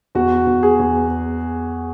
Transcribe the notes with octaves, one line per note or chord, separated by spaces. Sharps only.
E2 F#4
E2
G#4
E2